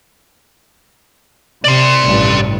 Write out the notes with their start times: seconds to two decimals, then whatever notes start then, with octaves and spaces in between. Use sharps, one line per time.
1.64 C3 D5 C6
2.02 A1 G2